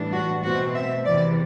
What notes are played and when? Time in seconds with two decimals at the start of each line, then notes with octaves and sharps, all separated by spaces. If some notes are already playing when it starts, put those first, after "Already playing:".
Already playing: A2 E3 G3 D4
0.12 F#4
0.43 B2 A3 C4 F#4
0.74 E5
1.05 E2 C3 E3 D5